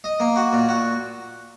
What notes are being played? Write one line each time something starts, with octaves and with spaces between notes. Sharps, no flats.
D#5
A#3
F#4
A#2
F#4